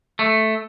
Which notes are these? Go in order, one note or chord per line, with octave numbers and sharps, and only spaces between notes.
A3